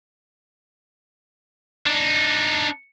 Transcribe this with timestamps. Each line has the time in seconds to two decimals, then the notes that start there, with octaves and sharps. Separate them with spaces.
1.86 D4 D#4